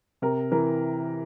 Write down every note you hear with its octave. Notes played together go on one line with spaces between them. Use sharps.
C3 A#4
E3 A#4